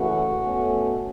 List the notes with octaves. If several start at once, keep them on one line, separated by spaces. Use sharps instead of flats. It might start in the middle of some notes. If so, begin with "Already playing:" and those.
Already playing: C#3 E3 A3 C#4 F#4
B2 A3 C#4